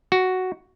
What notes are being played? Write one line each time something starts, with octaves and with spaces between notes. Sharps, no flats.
F#4